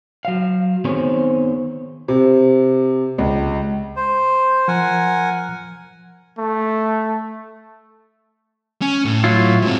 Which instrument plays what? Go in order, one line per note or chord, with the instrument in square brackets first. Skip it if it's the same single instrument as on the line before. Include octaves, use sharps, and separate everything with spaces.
[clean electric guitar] F#3 F5
D#3 B3 C4 G#4 C5 C#5
[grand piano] C3
C#2
[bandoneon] C5
[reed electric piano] F3 [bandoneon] A#4 F#5 G#5
[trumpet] A3
[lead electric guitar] C#4
A2
[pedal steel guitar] F#3 E4 F4
[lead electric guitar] G#2 C4